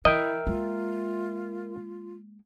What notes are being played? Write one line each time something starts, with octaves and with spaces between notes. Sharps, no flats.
E3 E4 A#4 D#5 E5 G5
G#3 A#3 F4